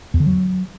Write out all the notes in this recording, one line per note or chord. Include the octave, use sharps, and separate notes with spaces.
E2
D3
F#3